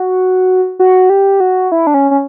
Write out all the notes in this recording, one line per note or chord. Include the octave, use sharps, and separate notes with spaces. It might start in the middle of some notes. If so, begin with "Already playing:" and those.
Already playing: F#4
F#4
G4
F#4
E4
D4
C#4
C#4